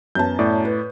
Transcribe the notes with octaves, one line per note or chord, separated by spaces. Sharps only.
F#2 B3 A5 G6
A2 D5
B4